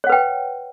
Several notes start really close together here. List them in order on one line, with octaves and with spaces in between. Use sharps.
C#5 F#5 B4 G5